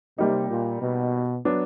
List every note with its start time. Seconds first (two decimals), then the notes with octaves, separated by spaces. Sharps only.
0.18 C3 G3 A#3 D#4
0.50 A#2
0.81 B2
1.45 F#3 B3 D4